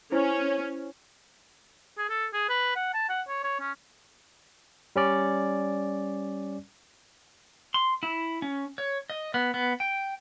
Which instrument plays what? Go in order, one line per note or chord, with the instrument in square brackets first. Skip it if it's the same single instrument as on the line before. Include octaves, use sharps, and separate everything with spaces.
[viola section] C#4 [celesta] E4 C5
[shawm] G#4
A4
G#4
B4
F#5
A5
F#5
C#5
C#5
C#4
[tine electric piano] G3 C#4 D5
[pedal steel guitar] C6
E4
C#4
C#5
D#5
B3
B3
G5